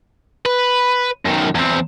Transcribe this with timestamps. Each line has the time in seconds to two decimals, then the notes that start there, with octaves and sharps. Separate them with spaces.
0.46 B4
1.26 F#2 D#3
1.55 E2 C4